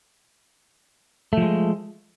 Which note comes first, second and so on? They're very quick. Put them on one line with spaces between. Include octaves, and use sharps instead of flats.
A3 F3 G#3